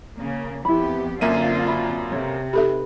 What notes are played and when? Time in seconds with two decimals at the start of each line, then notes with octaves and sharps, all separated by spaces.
0.16 C#3 A#3
0.65 F2 B3 E4 G4 B5
1.21 F#2 D3 A#3 C4 F4 E5 D#7
1.67 F#4 E5 B5
2.11 C3 A4 C#5
2.53 D#4 G4 A4 B4 E5 B5